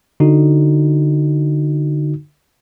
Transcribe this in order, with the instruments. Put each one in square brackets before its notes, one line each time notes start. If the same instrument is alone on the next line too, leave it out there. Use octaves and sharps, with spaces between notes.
[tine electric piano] D3 D#4 F#4